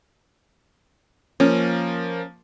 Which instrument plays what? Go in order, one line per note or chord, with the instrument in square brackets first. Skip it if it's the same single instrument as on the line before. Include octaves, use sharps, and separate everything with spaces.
[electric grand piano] F3 A#3 [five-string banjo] C#4